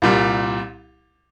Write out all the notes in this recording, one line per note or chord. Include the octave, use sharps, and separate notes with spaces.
C2 A#2 G3